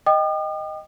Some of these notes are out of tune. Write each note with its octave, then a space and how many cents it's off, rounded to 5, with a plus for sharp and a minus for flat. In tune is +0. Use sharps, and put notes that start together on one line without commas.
D#5 +0 G5 +0 D#6 -45